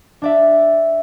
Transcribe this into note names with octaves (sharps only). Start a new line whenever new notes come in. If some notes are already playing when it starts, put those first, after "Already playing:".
D4 D5 E5